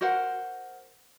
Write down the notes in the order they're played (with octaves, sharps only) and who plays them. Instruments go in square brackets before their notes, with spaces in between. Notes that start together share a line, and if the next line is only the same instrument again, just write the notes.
[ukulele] F#4 A#4 C5 F#5